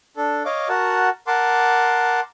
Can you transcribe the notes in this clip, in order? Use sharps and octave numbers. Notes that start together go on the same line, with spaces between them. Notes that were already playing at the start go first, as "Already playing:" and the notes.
D4 A4
C#5 D#5 F5 D6
F#4 A#4 F#5 A5
A#4 F#5 A5 C6 D6